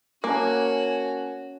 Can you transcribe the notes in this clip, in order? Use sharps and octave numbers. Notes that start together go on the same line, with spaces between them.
A#3 C#4 F#4 A#4 C#5 G#5 A5